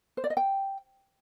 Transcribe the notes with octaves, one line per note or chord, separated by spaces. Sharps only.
C5
D5
D#5
G5